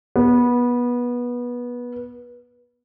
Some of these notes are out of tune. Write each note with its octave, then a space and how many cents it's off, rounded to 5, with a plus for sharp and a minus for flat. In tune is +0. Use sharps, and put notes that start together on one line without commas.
B3 -20